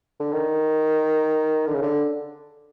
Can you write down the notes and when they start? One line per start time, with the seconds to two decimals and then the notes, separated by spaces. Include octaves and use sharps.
0.20 D3
0.32 D#3
1.67 D3
1.75 C#3
1.82 D3